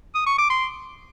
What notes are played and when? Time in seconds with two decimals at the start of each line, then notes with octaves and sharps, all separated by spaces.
0.15 D#6
0.27 C#6
0.38 D6
0.50 C6